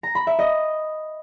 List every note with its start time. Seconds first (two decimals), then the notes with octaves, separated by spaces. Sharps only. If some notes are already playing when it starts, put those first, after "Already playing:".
0.03 A#5
0.15 B5
0.27 E5
0.39 D#5